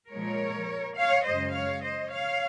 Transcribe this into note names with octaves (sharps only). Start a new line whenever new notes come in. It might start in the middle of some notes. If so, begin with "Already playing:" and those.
A#2 F3 G#3 A#4 C#5
C#5 F5
F#2 C#3 G#3 C5 D#5
C#5 F5
C5 D#5
C#5 F5